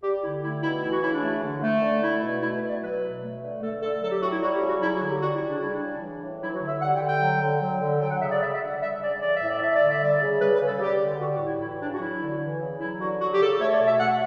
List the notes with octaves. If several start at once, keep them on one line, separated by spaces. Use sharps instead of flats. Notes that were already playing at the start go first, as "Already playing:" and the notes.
G3 G4
D3 E4
A3 E4
B2 E4
E3 E4
F#4
C#3 E4
D4
A3
D3
A3
D3
A3 E4
B2
A3 E4
B4
B2
D5
F#3 B4
B2
A3
D3
A3 A4
D3 A4
F#3 A4
G4
A2 F#4
E4
G3 F#4
G4
C#3
F#4
F#3 E4
F#4
D3
G4
G3 F#4
E4
C#3
D4
G3 E4
D4
C#3
E3
A2
F#3 E4
F#4
D3
E5
G3 F#5
G5
D3
G5
F#3
D3
F#3
D3
F#3 G5
F#5
C#3 E5
D5
G3 E5
E5
D3
F#5
G3 E5
C#3 D5
E3 D5
E5
A2
D5
A3 E5
D5
D3
E5
G3 D5
C#3
G3 B4
B4
C#3
A4
G3 G4
D3
G3 F#4
F#4
A2
E4
E3 E4
C#3 D4
F#4
F#3 E4
D3
E3
C#3
F#3 E4
D3 F#4
F#3 F#4
G4
C#3 A4
A3 C#5
D5
B2
E5
A3 F#5